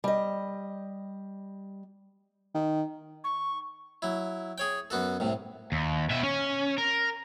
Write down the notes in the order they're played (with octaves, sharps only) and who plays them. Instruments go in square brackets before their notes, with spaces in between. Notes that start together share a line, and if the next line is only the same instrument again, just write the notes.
[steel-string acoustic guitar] G3 D#5
[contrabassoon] D#3
[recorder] C#6
[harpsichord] F#3 E4
G#4 C#5 G5
F#2 B3 F#4 A4
C2 A2 C3
[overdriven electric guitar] D#2
B2 E5
C#4
A#4